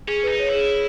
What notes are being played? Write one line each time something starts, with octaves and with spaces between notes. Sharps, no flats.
C#4 G#4
B4
D#4
C#5
E4
G#4